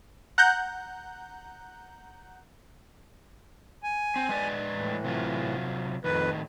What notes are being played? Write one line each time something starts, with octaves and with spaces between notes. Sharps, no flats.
F#5 A#5 F#6 G6
G#5
C4
G#3 B4 D5
A2 E3
C3 F#3 F4
F2 A2 D#3 B4